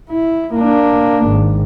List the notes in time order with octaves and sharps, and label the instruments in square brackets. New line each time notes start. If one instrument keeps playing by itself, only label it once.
[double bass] E4
A#3 D4
G#1